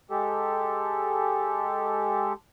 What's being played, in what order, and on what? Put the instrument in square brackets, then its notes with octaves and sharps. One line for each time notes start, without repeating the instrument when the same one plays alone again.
[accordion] G#3 G4 A4